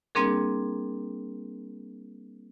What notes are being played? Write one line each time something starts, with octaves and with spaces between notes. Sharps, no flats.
G3 A#3 C4 D4 G#4 A#4